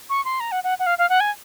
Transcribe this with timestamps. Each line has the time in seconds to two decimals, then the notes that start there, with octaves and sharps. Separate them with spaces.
0.10 C#6
0.25 C6
0.40 A#5
0.52 F#5
0.64 F#5
0.79 F#5
0.86 F5
0.98 F5
1.09 F#5
1.20 G#5